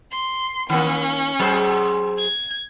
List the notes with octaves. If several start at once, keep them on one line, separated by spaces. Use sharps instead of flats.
C6
D#3 A#3 C#4
F#3 G#4 C5
G#6